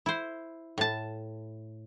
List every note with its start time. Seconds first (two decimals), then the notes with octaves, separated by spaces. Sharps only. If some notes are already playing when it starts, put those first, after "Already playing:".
0.06 E4 C5
0.78 A2 A5